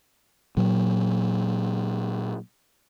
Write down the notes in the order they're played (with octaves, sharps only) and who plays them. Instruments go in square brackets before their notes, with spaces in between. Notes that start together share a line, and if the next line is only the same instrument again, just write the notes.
[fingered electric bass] A#2 F#3